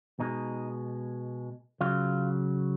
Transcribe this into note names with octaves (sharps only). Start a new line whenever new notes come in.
B2 G#3 D#4
C#3 F#3 F4